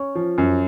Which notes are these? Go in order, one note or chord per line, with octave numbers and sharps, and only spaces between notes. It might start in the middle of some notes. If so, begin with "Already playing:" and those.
Already playing: C#4
F3
F#2